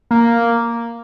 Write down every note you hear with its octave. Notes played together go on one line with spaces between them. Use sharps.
A#3